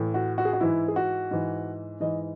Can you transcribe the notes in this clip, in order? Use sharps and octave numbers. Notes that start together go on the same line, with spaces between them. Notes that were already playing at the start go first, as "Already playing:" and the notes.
Already playing: A2 E3
F#4
F#4
G#4
F#4
G#2 E3 E4
G#4
F#4
G#2 E3
G#2 E3 D#5